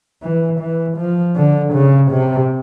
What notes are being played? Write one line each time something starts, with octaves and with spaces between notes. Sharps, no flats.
E3
E3
F3
D3
C#3
C3